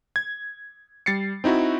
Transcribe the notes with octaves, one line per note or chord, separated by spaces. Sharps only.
G#6
G3 A6 C7 C#7
C4 D#4 E4 F#4